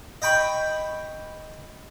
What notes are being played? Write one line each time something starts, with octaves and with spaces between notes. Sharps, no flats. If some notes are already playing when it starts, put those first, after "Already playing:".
D#5 G5 B5 C#6